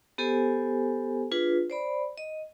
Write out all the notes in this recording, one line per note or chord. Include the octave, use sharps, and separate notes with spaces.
B3 G4 A4 C5 G#5
D4 F4 G#4 B4
C5 D5 B5
D#5